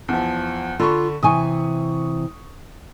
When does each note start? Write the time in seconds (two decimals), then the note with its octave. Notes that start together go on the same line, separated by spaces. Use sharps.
0.09 E2 F3
0.80 D3 F4 B5 C#6
1.23 C3 E3 G#5 C#6 D#6